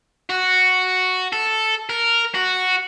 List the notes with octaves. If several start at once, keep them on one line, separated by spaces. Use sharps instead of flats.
F#4
A4
A#4
F#4